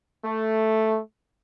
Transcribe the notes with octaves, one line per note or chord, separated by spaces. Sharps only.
A3